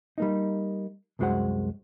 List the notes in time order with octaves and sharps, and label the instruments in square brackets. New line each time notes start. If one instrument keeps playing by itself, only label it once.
[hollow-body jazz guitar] G3 A#3 D#4
C2 F#2 G#3 F#4 C5 F#5